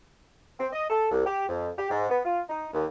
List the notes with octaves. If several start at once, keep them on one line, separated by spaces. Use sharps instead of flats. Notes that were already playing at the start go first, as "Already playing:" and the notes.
C4
D#5
A4
C2
G4
F2
G4
G#2
B3
F4
D#4
D#2